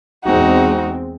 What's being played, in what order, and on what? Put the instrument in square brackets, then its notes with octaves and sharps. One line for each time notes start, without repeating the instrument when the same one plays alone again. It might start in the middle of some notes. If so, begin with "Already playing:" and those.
[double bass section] E2 G#3 C4 [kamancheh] D#4 F#4